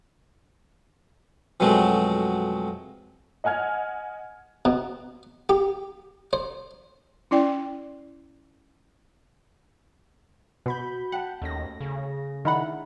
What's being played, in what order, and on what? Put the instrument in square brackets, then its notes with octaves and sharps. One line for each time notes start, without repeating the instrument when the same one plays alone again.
[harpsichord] F2 B2 F#3 G#3 A3
[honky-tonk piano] D#5 F#5 G#5 F6 G#6
[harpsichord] B2
G4
C5
[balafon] C#4 E4 D5 G5
[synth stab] B2 [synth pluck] F#4 B5 G6
[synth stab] F#5 [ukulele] G5 A5
[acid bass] D#2 [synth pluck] A3 C#4 A#6
[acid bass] C#3
[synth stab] D#3 F#5 [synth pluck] D4 E4 [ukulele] E5 A#5 B5